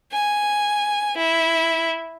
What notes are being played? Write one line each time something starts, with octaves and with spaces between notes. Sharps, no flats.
G#5
E4